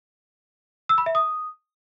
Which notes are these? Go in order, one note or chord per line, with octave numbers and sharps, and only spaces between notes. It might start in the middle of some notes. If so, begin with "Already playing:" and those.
E6
B5
E5
D#6